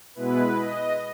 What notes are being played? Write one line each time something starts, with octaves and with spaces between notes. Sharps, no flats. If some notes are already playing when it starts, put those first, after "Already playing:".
B2 G#3 B3 E4 B4
D#5